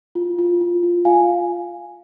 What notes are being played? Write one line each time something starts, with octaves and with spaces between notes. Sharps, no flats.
F4
F4
F4
F4
F4 F5 G#5